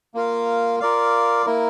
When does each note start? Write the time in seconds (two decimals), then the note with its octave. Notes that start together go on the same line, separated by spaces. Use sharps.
0.14 A#3 F4 A#4 F5
0.80 F4 A#4 D5 F5
1.46 A#3 E4 A#4